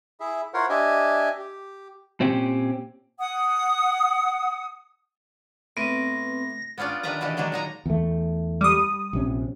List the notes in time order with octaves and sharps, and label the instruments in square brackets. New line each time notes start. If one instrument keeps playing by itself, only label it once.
[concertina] E4 G#4 E5
E4 F4 A#4 C5 C#5 F#5
D4 G4 D#5 E5 G#5
G4
[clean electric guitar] A#2 C4 C#4 G4
[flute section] F#5 D#6
[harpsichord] A2 [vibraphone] B3 C4 B4 [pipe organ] A#6
[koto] B3 C#4 D4 F4 D5
D#3 D4 G4 B4 A#5
B2 D#3 E3 D4 G4
D#3 F#3 G#3 D4
A#2 D#4 A#5
[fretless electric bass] E2 A3
[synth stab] G3 D#6
[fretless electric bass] A#1 C3 C#4